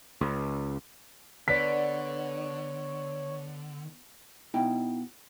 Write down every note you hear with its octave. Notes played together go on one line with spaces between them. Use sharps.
C#2
D3 B3 B4 C#5 D5 B6
B2 D#4 E4 G5